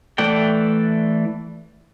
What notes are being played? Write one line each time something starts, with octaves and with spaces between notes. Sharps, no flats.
E3 A3 D5 F#5 G5